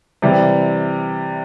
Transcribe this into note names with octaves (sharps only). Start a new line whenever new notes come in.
C3 E3 G3